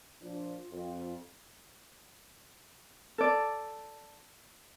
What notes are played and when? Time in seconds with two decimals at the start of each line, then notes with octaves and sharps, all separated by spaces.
0.22 A#2 F3 D4 F4
0.71 F2
3.18 A4 D5